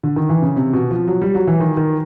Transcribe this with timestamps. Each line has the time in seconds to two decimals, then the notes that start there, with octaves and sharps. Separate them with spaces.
0.03 D3
0.16 D#3
0.29 E3
0.42 C#3
0.56 C3
0.73 B2
0.91 F3
1.08 F#3
1.22 G3
1.35 F#3
1.47 E3
1.60 D#3
1.77 D#3